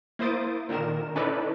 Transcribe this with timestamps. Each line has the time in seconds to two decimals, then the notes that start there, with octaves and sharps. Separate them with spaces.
0.19 A#3 E4 C5 D#6 A6 D7
0.69 A#2 D3 D#3 A#4 E7
1.16 C#4 D#4 E4 A4 B4 D5